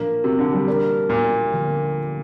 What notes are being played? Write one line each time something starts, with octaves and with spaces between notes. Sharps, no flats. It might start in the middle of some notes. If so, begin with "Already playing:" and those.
Already playing: A#2 F3 A#3 D4
C3
D3
G3
A#3 D4 A#4 D5
A#2
D3 F3 A#3